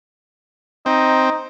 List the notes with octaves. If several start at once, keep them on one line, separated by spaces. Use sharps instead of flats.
C4 D#4